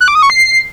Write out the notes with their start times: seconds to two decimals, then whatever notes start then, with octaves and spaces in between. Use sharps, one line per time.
0.01 F#6
0.08 D6
0.15 D#6
0.22 C#6
0.30 C7